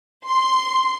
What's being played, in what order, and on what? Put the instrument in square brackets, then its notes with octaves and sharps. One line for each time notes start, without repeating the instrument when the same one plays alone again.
[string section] C6